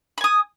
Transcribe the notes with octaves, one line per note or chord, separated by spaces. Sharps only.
G#5 B5 D#6